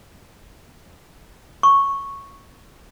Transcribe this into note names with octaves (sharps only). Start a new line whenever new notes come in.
C#6